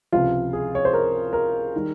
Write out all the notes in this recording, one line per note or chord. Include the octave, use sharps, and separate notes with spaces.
C#2 C3 F3 F4
G#4
C#5
C5
A#4
A#4
D#3 G3